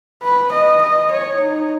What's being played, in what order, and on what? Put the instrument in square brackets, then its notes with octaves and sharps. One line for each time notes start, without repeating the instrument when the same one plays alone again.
[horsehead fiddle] B4
D#5
D#5
C#5
D#4